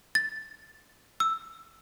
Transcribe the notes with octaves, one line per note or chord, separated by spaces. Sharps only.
A6
E6